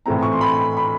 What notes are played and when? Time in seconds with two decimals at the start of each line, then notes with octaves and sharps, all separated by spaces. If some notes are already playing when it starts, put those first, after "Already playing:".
0.06 A2 E3 A3 C4 A#5
0.23 C#6
0.32 C6
0.41 B5
0.77 B5